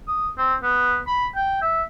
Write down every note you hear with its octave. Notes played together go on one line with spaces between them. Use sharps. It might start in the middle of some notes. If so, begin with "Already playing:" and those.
D#6
C4
B3
B5
G5
E5